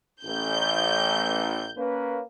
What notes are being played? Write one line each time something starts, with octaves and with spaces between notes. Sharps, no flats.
A1 G6
A#3 C#4 B4